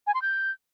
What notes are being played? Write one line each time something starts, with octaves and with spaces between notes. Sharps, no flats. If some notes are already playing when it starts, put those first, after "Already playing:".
G#5
C6
G6